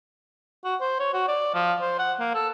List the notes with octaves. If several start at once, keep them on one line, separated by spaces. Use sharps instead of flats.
F#4
C5
C#5
F#4
D5
F3
C5
F#5
A#3
A4